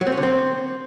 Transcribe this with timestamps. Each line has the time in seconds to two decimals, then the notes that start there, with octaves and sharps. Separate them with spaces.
0.01 F#3
0.07 C4
0.12 C#4
0.18 D3
0.23 C4